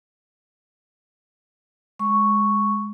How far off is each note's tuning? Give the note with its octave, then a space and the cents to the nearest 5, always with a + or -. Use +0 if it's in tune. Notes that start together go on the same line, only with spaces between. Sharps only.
G#3 +0 C#6 +0